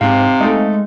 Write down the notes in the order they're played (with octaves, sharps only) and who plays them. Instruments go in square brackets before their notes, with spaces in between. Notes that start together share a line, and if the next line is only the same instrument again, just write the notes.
[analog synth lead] G#2 [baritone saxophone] C3 [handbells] C4 F5
[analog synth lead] G#3 [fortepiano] A3 D#4